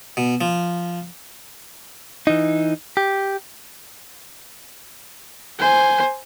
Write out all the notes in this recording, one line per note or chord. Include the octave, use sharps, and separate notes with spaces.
B2
F3
E3 D#4
G4
C5 G#5